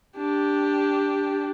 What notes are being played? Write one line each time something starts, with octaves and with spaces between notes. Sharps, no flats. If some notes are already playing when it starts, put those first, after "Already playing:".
D4 G4